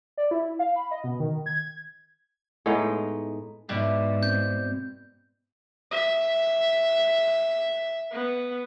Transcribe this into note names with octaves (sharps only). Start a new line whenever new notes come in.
D5
E4
F5
B5
D#5
B2
D#3
G#6
A2 G#3 B3 D#4
G#2 B2 G3 E4
C4 G6
E5
B3